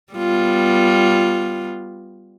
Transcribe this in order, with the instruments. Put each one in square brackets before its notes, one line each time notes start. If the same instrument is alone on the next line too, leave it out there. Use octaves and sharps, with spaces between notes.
[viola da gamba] G3 B3 F4